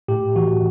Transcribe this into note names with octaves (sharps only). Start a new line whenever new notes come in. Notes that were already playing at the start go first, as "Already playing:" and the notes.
A2 G4
E3 F#4